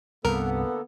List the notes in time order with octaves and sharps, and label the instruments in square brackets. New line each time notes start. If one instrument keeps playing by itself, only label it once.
[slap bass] C2 G2 [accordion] D3 A#3 A4 [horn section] B3 [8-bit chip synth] A#4